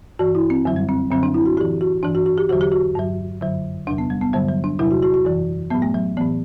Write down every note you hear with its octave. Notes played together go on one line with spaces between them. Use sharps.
G2 E3 F#4
E4
C4
F#2 D3 F#3
G3
C4
F#2 D3 F#3 C4
D4
E4
F#4
A2 E3 G4
F#4
G2 E3 D4
F#4
F#4
G4
E2 D3 F#3 F#4
G4
F#4
G2 F#3
F#2 D3 F#3
E2 C3 F#3 D4
B3
G3
B3
G2 D3 F#3 G3
F#3
D4
E2 C3 F#3 E4
F#4
F#4
F#4
F#2 E3
A2 F#3 B3
A3
F#3
A2 E3 B3